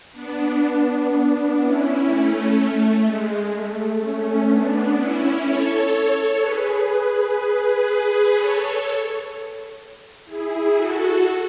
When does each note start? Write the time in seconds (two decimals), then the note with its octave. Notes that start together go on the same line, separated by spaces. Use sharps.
0.12 B3 D4
1.58 C#4 E4
2.05 A3 C#4
2.54 A3
3.02 G#3
3.51 A3
3.98 A3 C#4
4.46 B3 D4
4.95 C#4 E4
5.43 A4 C#5
6.40 G#4 B4
6.88 G#4 B4
8.33 A4 C#5
10.25 E4 G#4
10.73 F#4 A4